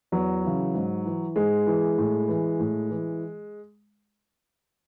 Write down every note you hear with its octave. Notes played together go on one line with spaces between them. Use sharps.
E2 F#3
C#3 E3
G#2
E3
G#2 G#3
E3
A2
E3
A2
E3